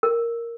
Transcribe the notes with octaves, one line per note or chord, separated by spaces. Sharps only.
A#4